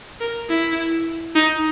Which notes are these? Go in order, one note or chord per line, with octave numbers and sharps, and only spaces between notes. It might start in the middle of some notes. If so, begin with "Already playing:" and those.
A#4
E4
D#4